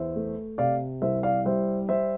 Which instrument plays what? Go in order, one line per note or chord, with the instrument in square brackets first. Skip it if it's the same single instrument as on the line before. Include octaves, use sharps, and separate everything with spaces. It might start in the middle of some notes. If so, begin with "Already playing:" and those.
Already playing: [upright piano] E2 C5 E5
A3
C3 D5 F5
C2 C5 E5
D5 F5
G3 C5 E5
G3 C5 E5